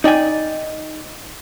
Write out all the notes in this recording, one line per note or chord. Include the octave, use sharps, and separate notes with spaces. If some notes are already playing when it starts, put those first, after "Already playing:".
D#4 D5 G5 G#5